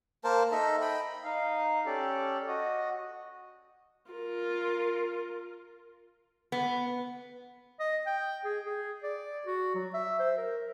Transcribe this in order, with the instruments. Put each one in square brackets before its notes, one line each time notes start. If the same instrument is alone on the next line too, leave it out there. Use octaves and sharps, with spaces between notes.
[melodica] A#3 A#4 C5 A5
D#4 A4 D#5 E5
D#5 G5 B5
[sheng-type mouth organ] D#4 F5
C#4 G4 A4 D5
F#4 D#5
[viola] F4 A#4
[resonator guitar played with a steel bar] B3
[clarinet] D#5
G5
G#4
G#4
D5
F#4
F#3
E5
C5
A#4